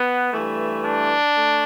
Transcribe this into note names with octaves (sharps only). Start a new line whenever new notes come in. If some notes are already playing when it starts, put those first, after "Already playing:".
Already playing: B3
G2 E3 A3
D4
A3